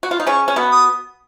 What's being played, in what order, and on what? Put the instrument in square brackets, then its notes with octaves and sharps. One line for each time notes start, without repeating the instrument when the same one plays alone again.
[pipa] F#4
F4
D#4
[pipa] C#3 C#4 [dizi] C#6
[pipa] C#4
B2 B3
[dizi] D#6